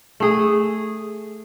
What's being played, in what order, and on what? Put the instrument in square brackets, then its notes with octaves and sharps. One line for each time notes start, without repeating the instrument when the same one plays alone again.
[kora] A3 G#4